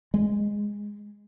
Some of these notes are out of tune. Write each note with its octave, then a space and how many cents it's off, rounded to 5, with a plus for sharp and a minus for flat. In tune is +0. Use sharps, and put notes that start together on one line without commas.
G#3 -10